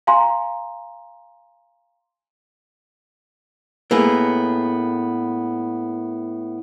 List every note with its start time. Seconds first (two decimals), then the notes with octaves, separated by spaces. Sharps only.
0.07 F5 G#5 A#5 C6
3.91 A2 A#3 B3 G#4